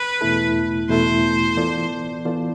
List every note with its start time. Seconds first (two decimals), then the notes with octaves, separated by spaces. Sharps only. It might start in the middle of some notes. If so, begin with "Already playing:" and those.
Already playing: B4
0.21 E2 B2 A3 E4 A4
0.89 E2 B2 A3 E4 A4 C5
1.57 E3 B3 F4 A4 D5
2.25 E3 B3 F4 A4 D5